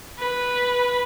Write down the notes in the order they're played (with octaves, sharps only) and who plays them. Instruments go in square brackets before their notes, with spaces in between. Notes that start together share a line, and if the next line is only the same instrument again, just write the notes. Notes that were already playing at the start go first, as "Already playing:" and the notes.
[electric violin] B4